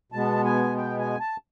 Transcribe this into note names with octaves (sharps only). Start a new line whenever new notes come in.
B2 G#3 B3 A5
G#5
G5
G#5
A5